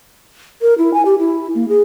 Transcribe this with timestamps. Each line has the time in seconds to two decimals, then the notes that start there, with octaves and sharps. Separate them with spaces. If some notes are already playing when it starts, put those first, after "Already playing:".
0.62 A#4
0.78 E4
0.94 G#5
1.05 G4
1.19 E4
1.55 A#3
1.69 G#4